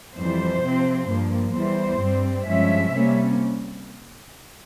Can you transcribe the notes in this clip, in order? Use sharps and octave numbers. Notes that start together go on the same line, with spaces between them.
F2 E3 G3 C5
C3 F3 C4
G2 F3 A#3
E2 E3 G3 C5
G2 G3 C4
G2 F3 G#3 C#4 E5
C3 G3 A#3 C#4